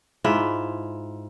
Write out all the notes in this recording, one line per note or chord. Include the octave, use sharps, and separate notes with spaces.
G#2 E4 F4 E5